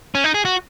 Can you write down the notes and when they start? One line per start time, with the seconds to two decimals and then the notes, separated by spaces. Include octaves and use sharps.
0.15 C#4
0.24 D#4
0.34 G#4
0.45 F#4